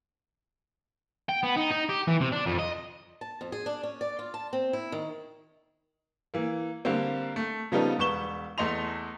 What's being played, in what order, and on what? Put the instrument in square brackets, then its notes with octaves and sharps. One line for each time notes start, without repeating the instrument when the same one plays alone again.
[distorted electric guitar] G5
B3
D#4
D#4
G4
E3
C3
D4
F2
D#5
[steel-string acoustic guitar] A5
F2
G#4
D4
C#4
D5
F4
A5
C4
E4
D#3
[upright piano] E3 A#3
D3 G3 A#3 C4
A3
C#3 F3 G3 B3 D#4 A4
E1 B4 C#6 E7 G7
E2 A3 D#5 C6 F7